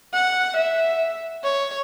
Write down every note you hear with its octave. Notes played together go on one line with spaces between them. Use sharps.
F#5
E5
C#5